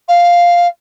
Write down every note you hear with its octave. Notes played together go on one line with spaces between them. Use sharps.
F5